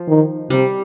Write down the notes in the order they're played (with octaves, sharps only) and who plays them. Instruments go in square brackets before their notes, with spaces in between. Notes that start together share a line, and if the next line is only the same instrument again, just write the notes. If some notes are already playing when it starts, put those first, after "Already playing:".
Already playing: [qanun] F3
[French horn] D#3
[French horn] C3 [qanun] G3